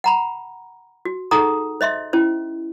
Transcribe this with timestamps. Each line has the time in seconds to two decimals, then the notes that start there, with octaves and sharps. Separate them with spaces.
0.04 F#5 A#5 B5
1.05 F#4
1.31 D#4 G#4 A4 F#5 A#5 D#6
1.81 C5 D#5 E5 C6
2.13 C#4 E4 C5